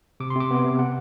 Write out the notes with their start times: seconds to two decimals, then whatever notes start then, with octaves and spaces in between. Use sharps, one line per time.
0.20 C3 D6
0.30 C6
0.35 C3
0.40 D6
0.51 B3
0.65 C3
0.79 F#5